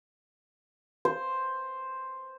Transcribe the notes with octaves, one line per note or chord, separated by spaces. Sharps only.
C5